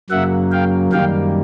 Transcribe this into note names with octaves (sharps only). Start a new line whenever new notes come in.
F#2 C#3 F#3 A#3 E5 F#5
F5 G5
F#2 D#3 G3 A#3 F5 G5